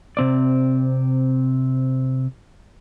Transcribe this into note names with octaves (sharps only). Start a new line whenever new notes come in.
C3 C4 D5